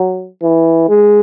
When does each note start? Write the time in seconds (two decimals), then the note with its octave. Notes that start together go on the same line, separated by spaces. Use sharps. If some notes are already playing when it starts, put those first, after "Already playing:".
Already playing: F#3
0.43 E3
0.89 G#3